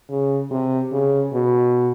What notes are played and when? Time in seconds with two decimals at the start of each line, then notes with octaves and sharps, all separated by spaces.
0.10 C#3
0.51 C3
0.92 C#3
1.33 B2